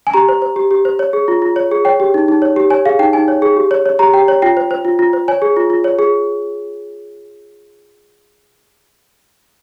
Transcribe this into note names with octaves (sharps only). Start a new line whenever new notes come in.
G#5
G4 A#5
C5
C5
G4
G4
C5
C#5
G#4
F4
F4
C#5
G#4
C#5 G5
G4
D#4
D#4
C#5
G4
C#5 G#5
G#4 F5
D#4 G5
D#4 G#5
C#5
G#4
G4
C#5
C#5
G4 A#5
G4 G5
C#5
F4 G5
C5
C5
F4
F4
C5
C#5 G#5
G#4
F4
F4
C#5
G#4